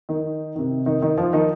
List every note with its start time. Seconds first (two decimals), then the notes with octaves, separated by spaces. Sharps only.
0.09 D#3 D#4
0.56 C3 D#3
0.86 D#3 D#4
1.02 D#3 D#4
1.18 F3 F4
1.33 D#3 D#4